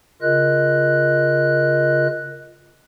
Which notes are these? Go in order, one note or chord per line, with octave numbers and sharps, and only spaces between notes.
C#3 F4 A#4 D#5 F#6